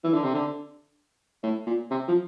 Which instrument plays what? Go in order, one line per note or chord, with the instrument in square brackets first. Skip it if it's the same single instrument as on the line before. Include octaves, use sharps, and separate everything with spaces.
[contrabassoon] E3
D3
C3
D3
A2
A#2
C3
F3